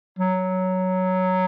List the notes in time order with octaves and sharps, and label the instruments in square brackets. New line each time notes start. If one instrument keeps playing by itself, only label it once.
[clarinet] F#3